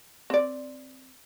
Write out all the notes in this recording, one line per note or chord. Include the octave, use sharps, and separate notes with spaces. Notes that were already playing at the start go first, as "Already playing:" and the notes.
C4 D5